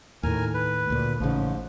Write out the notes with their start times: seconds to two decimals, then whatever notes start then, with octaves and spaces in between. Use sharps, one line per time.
0.23 D#2 A2 A#4 G#5 F6
0.54 B4
0.90 D2 A#2
1.20 A1 G#2 C#3 F3